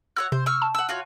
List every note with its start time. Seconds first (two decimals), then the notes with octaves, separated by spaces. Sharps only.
0.16 F#4 C#5 F#5 E6
0.32 C3 C5
0.46 C#6 E6 F6
0.62 A5
0.75 F#5 E6
0.89 F4 F#4 C#5